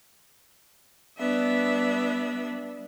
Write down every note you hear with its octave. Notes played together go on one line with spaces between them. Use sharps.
G3 B3 D4 E5